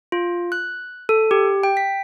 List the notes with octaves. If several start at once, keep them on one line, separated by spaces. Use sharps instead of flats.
F4
F#6
A4
G4
G5
B6